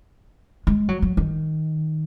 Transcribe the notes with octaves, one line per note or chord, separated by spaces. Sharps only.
G#3
F#3
F#3
D#3